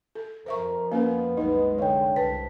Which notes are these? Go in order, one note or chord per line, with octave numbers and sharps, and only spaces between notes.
A4
F2 A#4 C5 E5 C#6
A#3 B3 C#4 A#4 F5
C2 F#2 G#3 D#4 B4 D#5
D3 G3 C#5 G5
C2 B4 A5 B6